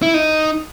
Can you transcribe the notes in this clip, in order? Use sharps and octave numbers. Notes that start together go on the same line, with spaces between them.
E4
D#4